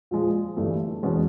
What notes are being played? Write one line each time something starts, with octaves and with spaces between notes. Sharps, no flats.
A#2 F3 G#3
G1 G2 E3 A3
E2 B2 G#3 C#4